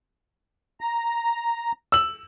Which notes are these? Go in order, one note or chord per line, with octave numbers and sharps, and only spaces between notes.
A#5
E6 F#7